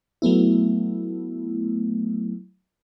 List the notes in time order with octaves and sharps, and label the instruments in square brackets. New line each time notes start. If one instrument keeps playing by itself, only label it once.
[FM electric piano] F#3 A3 B3 E4